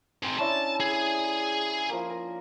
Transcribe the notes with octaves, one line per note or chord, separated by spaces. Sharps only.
G#3 C4 C5 A#5
C#4 D4 E4 A5
G#4
F3 A#3
A#4